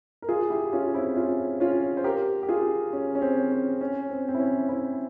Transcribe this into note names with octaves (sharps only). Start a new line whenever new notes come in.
A#4
F4 G#4
E4 G4
C#4 F4
C4 E4
C#4 F4
C#4 F4
C5
G4 A#4
G4
F4 G#4
C#4
C#4
C4
C#4
C#4
C4
C4
E4
C#4
C4 E4